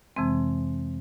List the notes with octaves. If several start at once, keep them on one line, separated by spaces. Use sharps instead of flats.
F2 C3 E3 G#3 C4